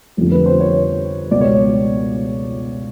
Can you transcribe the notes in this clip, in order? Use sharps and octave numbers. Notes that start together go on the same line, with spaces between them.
F1 F2 D3
B4
C5
C#5
C#2 B2 D5
C#5